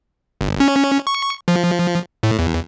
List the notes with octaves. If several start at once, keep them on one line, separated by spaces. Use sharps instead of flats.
G1
C#4
C#6
F3
A2
E2